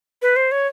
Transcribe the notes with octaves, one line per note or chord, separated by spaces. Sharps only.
B4
C5
C#5